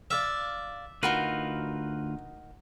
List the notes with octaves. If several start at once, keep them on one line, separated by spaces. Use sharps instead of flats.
D5 E5 F5
D2 D#4 F4 F#4 A#4 B4